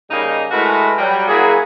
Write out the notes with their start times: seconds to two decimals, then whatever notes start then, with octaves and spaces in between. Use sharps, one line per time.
0.11 C#3 G3 A#3 D#4
0.51 G#3 A3 E4 F#4 A#4 B4
0.98 F#3 G3
1.28 F#3 A#3 E4 F#4 G#4